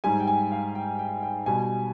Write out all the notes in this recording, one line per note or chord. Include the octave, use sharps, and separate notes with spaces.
G#2 G3 G#5
G5
G#5
F5
G5
G5
G5
B2 G3 G#5